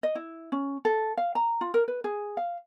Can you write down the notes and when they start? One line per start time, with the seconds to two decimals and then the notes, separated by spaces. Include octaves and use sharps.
0.03 D#5
0.15 E4
0.52 C#4
0.85 A4
1.17 F5
1.35 A#5
1.61 F4
1.74 A#4
1.88 B4
2.04 G#4
2.37 F5